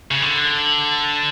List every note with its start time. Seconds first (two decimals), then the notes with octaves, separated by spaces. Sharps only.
0.11 C#3
0.22 D3